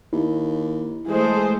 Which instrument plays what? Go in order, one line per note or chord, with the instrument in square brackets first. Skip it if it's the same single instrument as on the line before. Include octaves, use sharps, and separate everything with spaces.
[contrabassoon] D#2 [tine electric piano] E4
[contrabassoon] E3 [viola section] G#3 A3 [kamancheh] G#4 C5